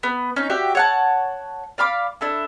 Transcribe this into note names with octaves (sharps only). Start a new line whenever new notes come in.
B3
C#4 D#4
F#4 G4 D5 E5
C#5 F#5 A5
D5 F5 B5 D6
D4 E4 A4